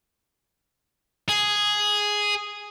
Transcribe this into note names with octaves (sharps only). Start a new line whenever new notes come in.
G#4